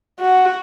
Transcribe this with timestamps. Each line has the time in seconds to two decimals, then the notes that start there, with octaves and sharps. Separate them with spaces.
0.20 F#4